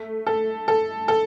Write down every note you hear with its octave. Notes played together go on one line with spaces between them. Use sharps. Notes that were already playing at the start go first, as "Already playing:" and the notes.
Already playing: A3
A4
A4
A4